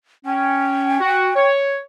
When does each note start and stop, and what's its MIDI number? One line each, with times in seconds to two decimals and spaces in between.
0.26 0.99 61
0.26 1.47 79
1.01 1.30 66
1.36 1.79 73